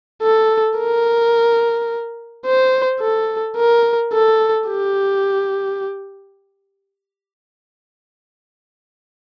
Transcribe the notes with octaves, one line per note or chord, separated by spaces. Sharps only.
A4
A#4
C5
A4
A#4
A4
G4